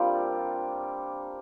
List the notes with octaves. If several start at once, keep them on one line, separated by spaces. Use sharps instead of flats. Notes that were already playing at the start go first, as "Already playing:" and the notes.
Already playing: G3 A#3 C4 D4 F4